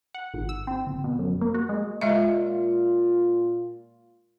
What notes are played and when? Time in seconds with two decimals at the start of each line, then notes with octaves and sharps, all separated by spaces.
0.14 F#5
0.34 G#1
0.49 E6
0.67 C4
0.86 G1
1.04 B2
1.19 F#2
1.41 A#3
1.54 F#4
1.69 G#3
2.01 A#2 G#3 F4 D#5 E5